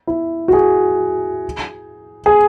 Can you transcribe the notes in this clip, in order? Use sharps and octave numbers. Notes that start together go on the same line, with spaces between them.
E4
F#4
G#4
G#4